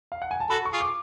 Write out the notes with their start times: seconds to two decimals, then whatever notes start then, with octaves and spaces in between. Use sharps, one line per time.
0.12 F5
0.22 F#5
0.31 G#5
0.40 A5
0.50 F#4 A4 B5
0.65 C#6
0.73 F4 G#4
0.80 D6